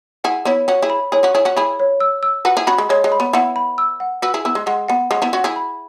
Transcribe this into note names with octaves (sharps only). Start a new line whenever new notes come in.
E4 G#4 F#5
B3 E4 C#5
C#4 F#4 C#5
E4 G#4
B5
E4 G#4 C#5
C#4 F#4
E4 G#4 C#5
C#4 F#4
E4 G#4 B5
C#5
E6
E6
F#4 B4 F#5
E4 G#4
C#4 F#4 B5
G#3
G#3 C#5
G#3
B5
B3
B3 E4 F#5
B5
E6
F#5
F#4 B4 E6
E4 G#4
B3 E4 E6
G#3
G#3 F#5
B3 F#5
G#3 C#4 F#5
B3 E4
C#4 F#4 F#5
E4 G#4
B5